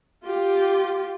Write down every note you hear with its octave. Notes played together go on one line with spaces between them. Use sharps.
F4 G4